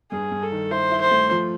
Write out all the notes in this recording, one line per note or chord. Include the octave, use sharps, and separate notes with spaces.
G2 G#4
G2
A4
D#3
E4 C5
E4
C5
A3
F3